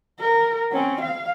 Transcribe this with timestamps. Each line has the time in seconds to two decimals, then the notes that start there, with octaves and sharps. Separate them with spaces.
0.19 A#4
0.72 C4 C#4
1.01 F5